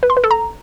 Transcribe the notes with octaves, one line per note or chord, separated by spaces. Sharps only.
B4
C6
B4
A4
A#5